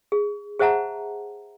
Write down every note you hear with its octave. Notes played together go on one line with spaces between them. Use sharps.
G#4
G#4 C5 E5 F#5 A5 A#5